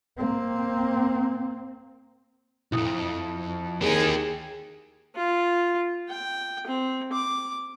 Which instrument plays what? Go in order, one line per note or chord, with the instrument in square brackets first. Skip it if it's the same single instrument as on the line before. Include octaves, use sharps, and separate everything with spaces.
[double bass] A#3 C4
[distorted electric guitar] B1 F2 [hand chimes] E4 D#6
[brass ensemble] D#2 G#4 [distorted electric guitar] A#3 G4
[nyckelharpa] F4
G5
C4
D6